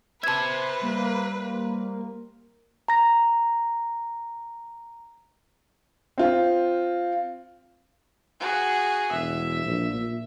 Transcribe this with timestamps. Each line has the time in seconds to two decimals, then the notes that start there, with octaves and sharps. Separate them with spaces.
0.24 B4 C5 E5 A5 G#6
0.82 G3 A#3 A#4
2.88 A#5 A#6
6.18 C4 F4
8.40 F#4 G#4
9.12 E1 E5
9.65 A#1
9.94 A#2